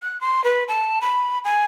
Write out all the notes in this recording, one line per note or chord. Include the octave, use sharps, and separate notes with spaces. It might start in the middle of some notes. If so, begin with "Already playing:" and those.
F#6
C6
B4
A5
B5
G#5